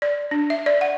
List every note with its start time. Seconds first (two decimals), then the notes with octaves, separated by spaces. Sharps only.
0.02 D5
0.31 D4
0.50 E5
0.66 D5
0.81 F#5